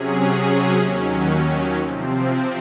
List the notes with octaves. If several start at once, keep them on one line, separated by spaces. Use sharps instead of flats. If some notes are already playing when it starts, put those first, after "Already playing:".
Already playing: C3 F#3 C#4 G#4
D#2 D#3 F#3 C#4
C3 F3 C4